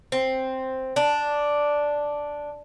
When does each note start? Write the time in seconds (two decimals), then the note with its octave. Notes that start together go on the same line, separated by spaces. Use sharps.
0.12 C4
0.96 D4